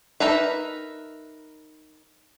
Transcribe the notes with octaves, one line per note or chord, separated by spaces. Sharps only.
D#4 A#4 B4 E5